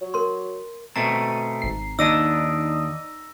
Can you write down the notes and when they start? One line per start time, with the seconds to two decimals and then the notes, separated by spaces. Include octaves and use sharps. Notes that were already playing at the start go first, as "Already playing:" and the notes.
0.01 F#3
0.14 A#4 C6
0.96 B2 A3 C4 A#5 D#7
1.62 G#1 C7
1.99 D#2 D4 D#4 D5 D#6 E6 A#6